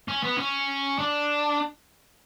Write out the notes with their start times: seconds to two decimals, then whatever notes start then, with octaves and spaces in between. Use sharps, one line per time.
0.08 C#4
0.23 B3
0.38 C#4
0.99 D4